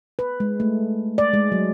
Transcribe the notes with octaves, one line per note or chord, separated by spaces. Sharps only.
B4
G#3
A3
D5
G#3
F#3